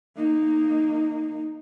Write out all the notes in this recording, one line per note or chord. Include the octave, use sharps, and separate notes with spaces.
A#3 D#4